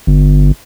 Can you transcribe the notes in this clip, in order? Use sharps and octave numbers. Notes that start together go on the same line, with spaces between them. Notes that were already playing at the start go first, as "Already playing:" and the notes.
G1